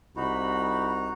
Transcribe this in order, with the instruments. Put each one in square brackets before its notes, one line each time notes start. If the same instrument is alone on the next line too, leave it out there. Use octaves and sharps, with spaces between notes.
[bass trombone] C2 [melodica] D#4 F#4 [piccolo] B5